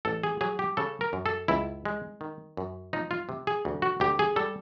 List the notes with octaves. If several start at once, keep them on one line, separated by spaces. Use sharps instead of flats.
A1 A4
G#4
F#3 G#4
G4
C#3 A4
A#4
F#2
A4
C#2 E4
G#3
D#3
F#2
F3 D#4
F4
C3
G#4
D2
F#4
D2 G4
G#4
G3 A4